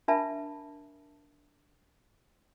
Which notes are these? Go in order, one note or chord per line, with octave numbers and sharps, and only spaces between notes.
D4 A#4 E5 A5 B5